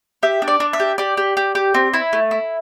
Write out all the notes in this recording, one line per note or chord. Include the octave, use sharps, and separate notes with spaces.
G4 E5
D4
D5
D4
E5
G4
G4 D5
G4
G4
G4
C4
E4
A3
E4